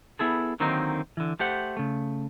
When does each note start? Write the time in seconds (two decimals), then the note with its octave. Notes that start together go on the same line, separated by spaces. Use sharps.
0.19 B3 E4 G#4 A4
0.60 D3 D#3 F#3 A#3 C4 D#4
1.17 D3 E3
1.39 A3 G4 C5 F#5
1.77 C#3 A3